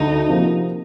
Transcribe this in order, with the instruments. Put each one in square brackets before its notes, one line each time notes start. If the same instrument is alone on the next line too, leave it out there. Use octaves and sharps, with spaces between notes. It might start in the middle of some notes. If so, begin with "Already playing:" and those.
Already playing: [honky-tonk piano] D2 [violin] D#4
[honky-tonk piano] C3 F3 A#3